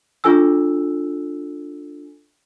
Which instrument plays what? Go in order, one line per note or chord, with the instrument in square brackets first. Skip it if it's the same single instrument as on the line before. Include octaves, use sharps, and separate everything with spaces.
[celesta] D4 F4 A4 G#5 E6